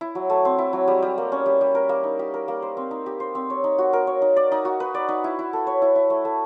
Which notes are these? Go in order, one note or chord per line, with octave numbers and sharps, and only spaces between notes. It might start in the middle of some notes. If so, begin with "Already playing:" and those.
E4
F#3
A3
C4
E4
F#3
G3
G3
A#3
C#4
G3
G3
A#4
A#3
D#4
G4
A#4
A#3
C5
C4
D#4
G4
C5
C4
C#5
D#4
F#4
A#4
C#5
D#4
D5
D#4
F#4
B4
D5
D#4
E4
E4
A4
C#5
E4
E4
A3
A3